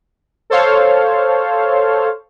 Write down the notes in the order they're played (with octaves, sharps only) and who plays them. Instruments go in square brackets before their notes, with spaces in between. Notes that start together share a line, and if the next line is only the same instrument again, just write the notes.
[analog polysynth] A4 C5 C#5 F5